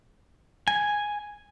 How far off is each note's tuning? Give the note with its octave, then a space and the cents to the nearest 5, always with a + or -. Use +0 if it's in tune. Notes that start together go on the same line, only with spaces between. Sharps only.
G#5 +0